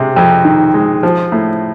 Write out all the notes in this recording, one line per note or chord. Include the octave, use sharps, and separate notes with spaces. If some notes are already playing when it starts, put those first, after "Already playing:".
Already playing: C3 G#3
F2
D#3
G#3
F3
A2